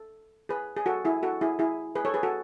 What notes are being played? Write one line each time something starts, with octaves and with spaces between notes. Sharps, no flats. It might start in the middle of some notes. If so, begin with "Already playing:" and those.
Already playing: A4
G#4 B4
G#4
F#4 A4
E4 G#4
F#4 A4
E4 G#4
E4 G#4
G#4 B4
A4 C#5
G#4 B4
F#4 A4